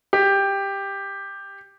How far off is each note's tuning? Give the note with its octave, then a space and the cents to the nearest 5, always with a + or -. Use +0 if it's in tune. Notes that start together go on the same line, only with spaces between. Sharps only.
G4 +10